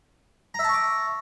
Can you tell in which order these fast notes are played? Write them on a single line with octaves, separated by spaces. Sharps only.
A#5 E5 A5 C#6 D6